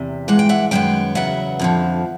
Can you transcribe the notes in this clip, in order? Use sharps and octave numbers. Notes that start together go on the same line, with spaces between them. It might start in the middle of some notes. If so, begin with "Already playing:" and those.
Already playing: E2 C3
G2 E3 G#3 F#5
G5
E5 F#5
F#2 D#3 G#3 B3 G5
E2 C#3 F#3 B3 E5 F#5
F2 D3 F3